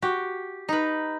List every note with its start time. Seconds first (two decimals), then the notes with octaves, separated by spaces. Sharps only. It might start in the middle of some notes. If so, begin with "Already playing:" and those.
0.02 F#4 G4
0.69 D#4 B4